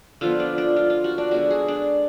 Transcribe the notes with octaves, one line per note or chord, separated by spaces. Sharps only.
D3 F3 B3 F4
D4
D4
F4
F4
F#4
D4
D3 G#3 B3 F#4
G#4
D4